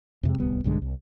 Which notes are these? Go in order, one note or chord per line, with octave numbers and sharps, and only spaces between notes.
F2 C3 G#3
D1 C2 G3 B3
B1 G2 D3 G#3
C2